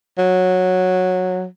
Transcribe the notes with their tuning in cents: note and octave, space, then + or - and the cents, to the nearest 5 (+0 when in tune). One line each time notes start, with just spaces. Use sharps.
F#3 -10